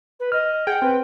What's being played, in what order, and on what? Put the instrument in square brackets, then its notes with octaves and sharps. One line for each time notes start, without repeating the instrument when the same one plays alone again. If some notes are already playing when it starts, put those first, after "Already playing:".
[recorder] B4
[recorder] D#5 [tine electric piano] F6
[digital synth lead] G#4 [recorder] F#5 [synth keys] G5
[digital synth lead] C4 [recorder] B4